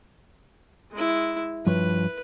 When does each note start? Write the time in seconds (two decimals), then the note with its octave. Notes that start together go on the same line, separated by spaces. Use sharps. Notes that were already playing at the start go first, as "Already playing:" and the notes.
0.92 G#3 E4
1.67 G2 F3 B4 C#5